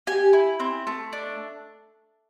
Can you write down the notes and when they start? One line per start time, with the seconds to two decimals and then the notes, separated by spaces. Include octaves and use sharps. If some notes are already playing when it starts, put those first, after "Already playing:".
0.07 G4 G#5
0.33 E4
0.60 C4
0.87 A3
1.13 D4